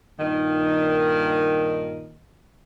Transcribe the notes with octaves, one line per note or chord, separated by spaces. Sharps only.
G2 A#2 D#3